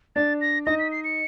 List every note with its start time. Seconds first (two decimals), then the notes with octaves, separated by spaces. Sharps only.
0.16 D4 D5 A6
0.41 A#6
0.66 D#4 D#5 A#6
0.79 B6
0.92 C7
1.04 C#7